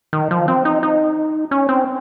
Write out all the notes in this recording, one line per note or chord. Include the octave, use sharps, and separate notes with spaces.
D#3
F3
C4
D#4
D#4
C#4
C4